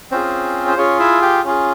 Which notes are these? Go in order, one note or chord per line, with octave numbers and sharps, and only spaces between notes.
C4 C#4 F4 G#4 C5
C5
C#4 F4 G#4 C#5
E4 E5
G4 G5
C#4 F4 G#4